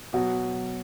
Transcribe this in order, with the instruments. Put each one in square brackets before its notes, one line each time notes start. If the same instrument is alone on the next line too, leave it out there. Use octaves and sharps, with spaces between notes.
[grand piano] B2 [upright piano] F#3 F#4